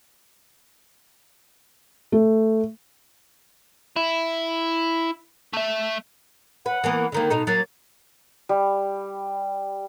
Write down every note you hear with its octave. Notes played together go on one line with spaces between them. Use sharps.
A3
E4
A3 E5
B4 F#5
E3 A#3 B3
D3 D#3 A#3
B2 D#4 A4 A#5
F#3 A#3 A6
G3